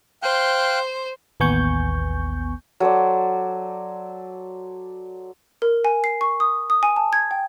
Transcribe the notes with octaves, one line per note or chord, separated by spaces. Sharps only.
C5 F5 G5 F#6
A1 D#2 B3 G#5 C#6 G6
F#3 A4 C5 D5
A#4
G#5
C7
C#6
D#6
D#6
G#5
A5
G#6
G5